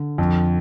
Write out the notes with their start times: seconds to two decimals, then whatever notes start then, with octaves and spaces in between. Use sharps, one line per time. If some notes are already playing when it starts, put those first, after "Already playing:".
Already playing: D3
0.18 F2